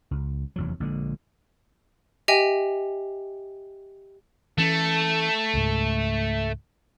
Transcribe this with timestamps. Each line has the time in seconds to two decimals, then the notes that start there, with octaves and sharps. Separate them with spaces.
0.11 C#2
0.56 F1 E2 F#3
0.80 A#1 D3 G#3
2.28 G4 D#5 E5 G5 G#5
4.58 E3 A3 C#4
5.53 C#2 G#2